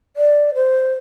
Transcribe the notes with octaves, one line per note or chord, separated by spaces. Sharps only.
D5
C5